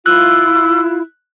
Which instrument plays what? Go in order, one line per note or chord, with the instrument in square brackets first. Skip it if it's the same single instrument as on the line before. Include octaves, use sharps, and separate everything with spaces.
[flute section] E4 F4 [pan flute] E6 [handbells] F#6